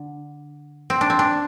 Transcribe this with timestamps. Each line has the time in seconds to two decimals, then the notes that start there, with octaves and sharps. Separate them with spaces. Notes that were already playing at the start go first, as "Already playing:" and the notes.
Already playing: D3
0.90 C4
1.01 D4
1.10 C4
1.19 D4